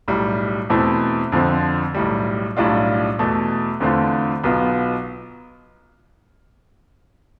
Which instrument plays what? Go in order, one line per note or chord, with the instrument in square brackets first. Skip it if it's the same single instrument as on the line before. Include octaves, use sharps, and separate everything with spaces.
[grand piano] B1 A2 G3
E2 B2 A3 C4 E4
F2 D3 F3 C4
B1 A2 G3
B1 A2 G3 D4 F4
E2 B2 A3
E2 D3 A3 C4 F4
B1 B2 B3 F4